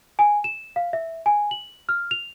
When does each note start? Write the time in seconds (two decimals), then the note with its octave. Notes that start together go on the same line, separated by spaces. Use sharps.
0.19 G#5
0.44 E7
0.76 F5
0.93 E5
1.26 G#5
1.51 F#7
1.89 F6
2.11 F7